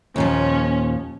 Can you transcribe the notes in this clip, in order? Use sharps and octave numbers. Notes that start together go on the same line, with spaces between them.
D#2 A#2 F3 C#4